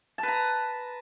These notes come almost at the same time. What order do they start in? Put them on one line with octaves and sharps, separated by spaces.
A5 B4 A#5